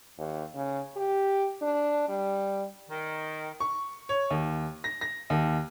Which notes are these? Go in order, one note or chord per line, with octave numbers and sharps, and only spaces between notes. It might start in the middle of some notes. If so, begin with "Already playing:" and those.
D#2
C#3
G4
D4
G3
D#3
C#6
C#5
D#2
A#6
A#6
D#2